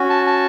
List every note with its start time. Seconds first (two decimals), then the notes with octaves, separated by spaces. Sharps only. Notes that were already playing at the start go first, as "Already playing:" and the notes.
Already playing: C#4 F#4
0.10 A5
0.27 A5